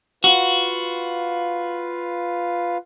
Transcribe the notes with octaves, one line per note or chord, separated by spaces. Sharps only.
F4 F#4 B4 F5